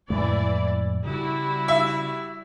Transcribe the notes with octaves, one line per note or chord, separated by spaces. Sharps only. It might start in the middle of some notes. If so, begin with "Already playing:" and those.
F2 A2 E3 G#3 E4 D5
C#3 G3 E4 F#4
E5